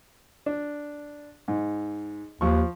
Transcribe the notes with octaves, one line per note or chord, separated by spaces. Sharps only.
D4
G#2
D#2 F3 C#6